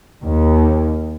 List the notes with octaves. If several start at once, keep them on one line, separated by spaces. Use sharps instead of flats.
D#2